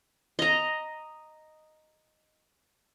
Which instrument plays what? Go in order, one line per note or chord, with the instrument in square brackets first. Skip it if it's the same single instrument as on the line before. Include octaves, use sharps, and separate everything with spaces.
[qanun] D#5 A#5